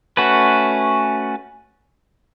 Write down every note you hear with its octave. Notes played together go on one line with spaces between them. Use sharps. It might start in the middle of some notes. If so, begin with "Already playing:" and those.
A3 C#4 F#4 B4